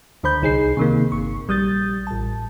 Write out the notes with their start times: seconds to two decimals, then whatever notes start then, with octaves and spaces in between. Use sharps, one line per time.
0.23 D2 D3 C5 B5 G6
0.42 C2 D#4 G#4 C7
0.77 C3 D#3 A#3
1.12 G1 C#6
1.48 A#1 G3 D#6 G6 A6
2.07 A1 A5